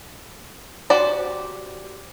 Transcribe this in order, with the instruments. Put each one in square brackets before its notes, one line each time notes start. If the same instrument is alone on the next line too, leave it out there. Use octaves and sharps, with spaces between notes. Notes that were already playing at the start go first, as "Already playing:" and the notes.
[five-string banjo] F#4 G4 C5 D5